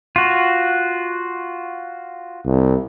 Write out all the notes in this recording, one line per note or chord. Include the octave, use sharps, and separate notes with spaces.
F4 F#4
C2